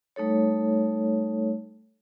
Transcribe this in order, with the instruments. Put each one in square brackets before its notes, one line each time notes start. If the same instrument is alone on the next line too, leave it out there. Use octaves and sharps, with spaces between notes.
[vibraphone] G3 A3 D#4 A4 C#5